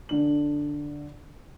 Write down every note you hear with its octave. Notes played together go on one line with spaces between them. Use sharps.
D3 D4 F#7